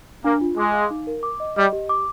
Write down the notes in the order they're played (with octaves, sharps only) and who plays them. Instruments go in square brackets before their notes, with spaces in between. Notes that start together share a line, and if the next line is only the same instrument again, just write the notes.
[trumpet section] A#3 [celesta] D4
[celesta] F4
[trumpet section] G#3 [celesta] D6
[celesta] F5
D#4
A#4
D6
D#5
[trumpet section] G3 [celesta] D#5
[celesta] G4
D6